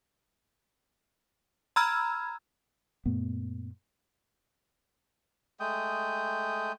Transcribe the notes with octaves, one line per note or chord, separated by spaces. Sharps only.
A#5 B5 E6 F6 G#6
F#2 A#2 A3 B3
G#3 A3 G5 D#6